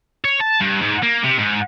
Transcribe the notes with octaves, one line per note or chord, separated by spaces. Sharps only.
C#5
A5
G2
G#2
A#3
C3
G#2